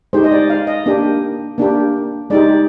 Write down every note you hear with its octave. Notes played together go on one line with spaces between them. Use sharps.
G#3 D#4 G4 C5
D#5
D5
F5
D#5
A#3 D4 G4
A#3 D4 G4
G#3 D#4 G4 D5